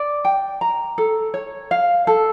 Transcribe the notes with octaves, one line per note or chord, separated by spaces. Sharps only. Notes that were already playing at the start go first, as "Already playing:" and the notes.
Already playing: D5
G5
A#5
A4
C#5
F5
A4